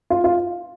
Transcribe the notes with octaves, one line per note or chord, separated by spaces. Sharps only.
F4
F4